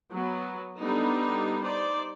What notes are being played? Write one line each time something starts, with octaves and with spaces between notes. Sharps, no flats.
F#3 B3
G3 B3 D4 D#4 A4
D#4 C5 D5